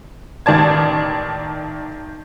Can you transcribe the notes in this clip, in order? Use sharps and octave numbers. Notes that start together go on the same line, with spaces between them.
A1 D#3 D5 A5 G#6